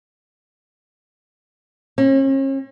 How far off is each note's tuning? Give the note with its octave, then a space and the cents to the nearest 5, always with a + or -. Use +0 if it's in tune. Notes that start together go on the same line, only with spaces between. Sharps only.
C#4 -40